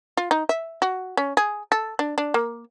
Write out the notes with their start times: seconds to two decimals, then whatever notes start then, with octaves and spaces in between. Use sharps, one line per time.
0.17 F4
0.31 D#4
0.49 E5
0.82 F#4
1.17 C#4
1.37 G#4
1.72 A4
1.99 D4
2.18 D4
2.34 A#3